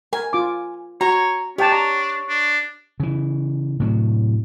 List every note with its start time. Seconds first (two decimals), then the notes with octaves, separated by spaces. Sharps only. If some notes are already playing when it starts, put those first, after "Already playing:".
0.13 A#4 G#5
0.33 F4 D6
1.01 F#4 C#5 A#5
1.58 D4 G4 C#5 G5 A5
1.72 A#5
2.29 D4
3.00 C#3 E3
3.80 A2 C3 F#3